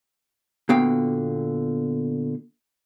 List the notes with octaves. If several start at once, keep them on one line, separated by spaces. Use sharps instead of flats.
A#2 D3 B3 F#4 F5 G5